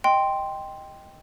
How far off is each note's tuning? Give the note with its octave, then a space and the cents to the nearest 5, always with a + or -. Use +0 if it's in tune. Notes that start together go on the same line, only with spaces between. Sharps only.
D#5 +0 G5 +0 C6 +0